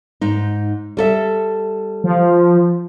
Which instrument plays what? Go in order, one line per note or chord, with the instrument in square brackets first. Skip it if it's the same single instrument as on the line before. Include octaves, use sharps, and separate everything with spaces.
[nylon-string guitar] G#2 D#4
G3 A4 E5
[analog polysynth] F3